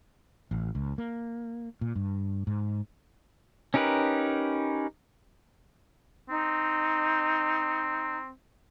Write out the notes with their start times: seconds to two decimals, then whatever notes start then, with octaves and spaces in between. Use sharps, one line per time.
0.51 A1
0.75 C#2
0.98 A#3
1.81 A#2
1.96 G2
2.47 G#2
3.74 C#4 D#4 G4 A#4 B4
6.29 C4 D#4